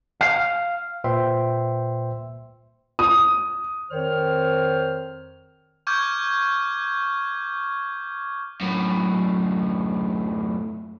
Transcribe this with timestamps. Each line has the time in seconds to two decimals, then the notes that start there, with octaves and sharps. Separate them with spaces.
0.21 F5
1.04 A#2 B4 C5 E5 G5 C6
2.99 D#6
3.90 F2 D#3 C5 C#5 F6
5.87 C#6 D6 F6 G6 G#6
8.61 F#2 A2